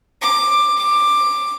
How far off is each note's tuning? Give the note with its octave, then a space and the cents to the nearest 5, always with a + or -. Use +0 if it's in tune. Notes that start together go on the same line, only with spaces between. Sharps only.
D6 +15
D6 +10